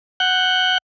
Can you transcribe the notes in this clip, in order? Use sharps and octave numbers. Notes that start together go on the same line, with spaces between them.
F#5 F#6 G6